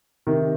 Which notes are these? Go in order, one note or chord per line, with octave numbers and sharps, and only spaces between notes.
C3 D#3